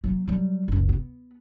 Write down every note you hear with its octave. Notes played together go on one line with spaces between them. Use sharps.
F#3 A#3
F#3 G3
F#1 C#2
B3